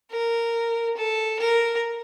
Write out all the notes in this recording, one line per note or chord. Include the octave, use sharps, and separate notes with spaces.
A#4
A4
A#4